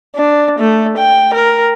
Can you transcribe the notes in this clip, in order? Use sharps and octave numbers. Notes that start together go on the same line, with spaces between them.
D4
A3
G5
A#4